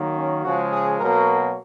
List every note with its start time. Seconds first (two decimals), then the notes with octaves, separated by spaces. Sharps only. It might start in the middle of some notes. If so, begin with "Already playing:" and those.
Already playing: D#3 F#3 A#3
0.16 C#4
0.44 C#3 F3 G#3 F#4
0.71 G#4
0.99 B2 F#3 A#3 A#4